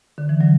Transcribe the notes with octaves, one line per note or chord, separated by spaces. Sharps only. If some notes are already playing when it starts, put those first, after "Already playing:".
D3
E3
D3 F#3